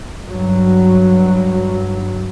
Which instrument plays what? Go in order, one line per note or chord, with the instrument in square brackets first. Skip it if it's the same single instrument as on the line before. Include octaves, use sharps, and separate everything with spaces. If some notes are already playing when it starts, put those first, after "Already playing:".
[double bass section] G2 F#3